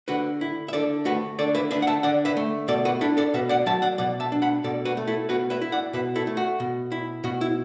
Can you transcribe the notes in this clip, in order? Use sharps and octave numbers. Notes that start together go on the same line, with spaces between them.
D3 F#4 B4
E4
E5
D3 A4 D5
A3 F#4 B4
D3 A4 D5
B4 E5
D4 B4 E5
F#5
E5 A5
D3 D5 F#5
B4 E5
A3
B2 A4 D5
F#4 B4
D4 E4 A4
A4 D5
B2 B4 E5
D5 F#5
F#3 E5 A5
D5 F#5
B2 D5 F#5
E5 A5
D4
F#5 B5
B2 A4 D5
F#4 B4
A3
E4 A4
B2 F#4 B4
B4 E5
E4
D5 F#5
B2 B4 E5
E4 A4
A3
F#4
B2
E4
B2 F#4
E4